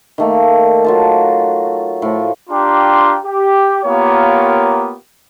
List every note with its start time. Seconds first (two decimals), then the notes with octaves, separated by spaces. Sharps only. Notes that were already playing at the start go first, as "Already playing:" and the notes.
0.18 D#3 A3 A#3
0.85 F#3 F4 A5
2.02 A2 F3
2.50 D4 F4 G4 G5 A#5 C6
3.25 G4
3.84 A#3 B3 F4 G4 A#4 C#5